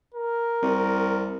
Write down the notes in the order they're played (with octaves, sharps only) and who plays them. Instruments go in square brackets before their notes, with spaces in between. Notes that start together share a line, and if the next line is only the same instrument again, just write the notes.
[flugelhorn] A#4
[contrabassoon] C2